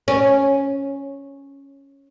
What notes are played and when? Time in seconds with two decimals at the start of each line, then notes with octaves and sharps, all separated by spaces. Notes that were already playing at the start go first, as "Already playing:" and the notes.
0.08 C#4